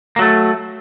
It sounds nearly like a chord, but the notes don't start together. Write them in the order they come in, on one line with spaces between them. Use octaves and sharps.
A#3 F#3 A3